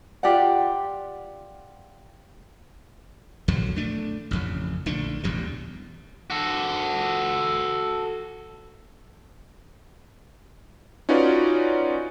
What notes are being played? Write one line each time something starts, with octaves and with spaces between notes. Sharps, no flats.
F4 G4 D5 F#5
A#1 E2 D3 F#3
A3 D4
A1 F2 C#3
A#1 D3 A3 D4
A1 E2 B2 G3
F#4 A4
C#4 D#4 F4 F#4 B4 D5